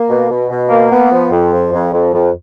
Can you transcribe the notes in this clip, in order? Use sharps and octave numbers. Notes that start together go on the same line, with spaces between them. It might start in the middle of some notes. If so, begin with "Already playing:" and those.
Already playing: A#3
B2
B2
B2
A#3
B3
F3
F2
F3
F2
F2
F2